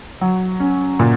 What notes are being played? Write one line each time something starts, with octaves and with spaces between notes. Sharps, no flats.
F#3
C#4
A#2